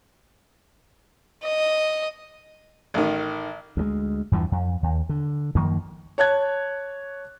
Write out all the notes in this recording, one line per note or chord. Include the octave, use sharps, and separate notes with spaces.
D#5
A1 D#3
D2 F#3 G#3
E2 G2 E3 F3
F2
D#2
D3
F#2 D#3 F3 A#3
C#5 A5 F#6 G#6